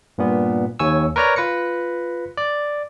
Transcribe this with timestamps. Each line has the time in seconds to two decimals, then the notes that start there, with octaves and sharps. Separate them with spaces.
0.18 G2 A#2 B3
0.79 D#2 C#5 G#5 C#6 E6
1.16 A#4 B4 C#5 D5 A#5
1.36 F4 B4 A#6 C#7
2.38 D5